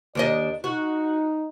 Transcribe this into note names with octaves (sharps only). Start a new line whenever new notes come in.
D#2 D4 D5 D#5
D#4 F#4